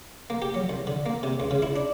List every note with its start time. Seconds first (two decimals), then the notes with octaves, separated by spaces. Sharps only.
0.30 A#3
0.42 G4
0.54 F#3
0.69 C2
0.87 D3
1.06 A#3
1.23 C3
1.40 C#2
1.51 C#3
1.62 E4
1.76 D4